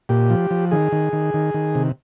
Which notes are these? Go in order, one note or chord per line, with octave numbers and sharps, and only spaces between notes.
A#2 G4
F3
F3
D#3 G#4
D#3
D#3
D#3
D#3
C3